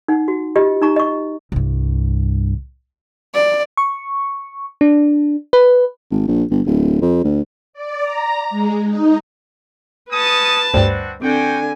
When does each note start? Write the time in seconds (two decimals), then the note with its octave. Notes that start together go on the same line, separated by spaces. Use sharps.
0.08 D#4 F#5
0.28 F#4
0.55 F4 G4 D#5
0.82 D#4 A#5 C#6
0.96 D#5 C#6
1.52 C2 G2
3.34 D5
3.77 C#6
4.81 D4
5.53 B4
6.11 G#1
6.27 A#1
6.51 G1
6.66 D1
7.01 F2
7.24 D2
7.73 D5
8.03 A#5
8.50 G#3
8.84 D#4
10.11 C#4 B4 A5 D#6
10.74 D2 G2 C4 D4 F#4 C5 D5 G5
11.22 D3 C4 F#4 G5 G#5